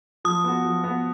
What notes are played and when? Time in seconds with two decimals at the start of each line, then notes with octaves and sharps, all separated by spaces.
0.25 F3 D#6
0.44 B3 F#4
0.65 F3
0.84 B3 F#4